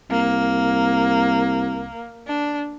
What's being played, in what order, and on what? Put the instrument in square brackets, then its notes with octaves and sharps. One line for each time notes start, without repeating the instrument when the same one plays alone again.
[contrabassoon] C2 [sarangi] A#3
[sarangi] D4